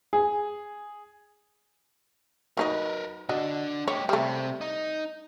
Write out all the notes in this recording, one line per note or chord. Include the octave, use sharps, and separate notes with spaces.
G#4
F#3 D#4 A#4 B4 D#5
D3 D4 F#4 D#5
G#3 G4 C#5
C3 G3 A3 C4
D#4